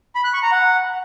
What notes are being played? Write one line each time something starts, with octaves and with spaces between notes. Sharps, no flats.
B5
F#6
C#6
A#5
F#5